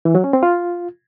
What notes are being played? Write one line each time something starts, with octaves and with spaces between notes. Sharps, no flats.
E3
F#3
C#4
C4
F4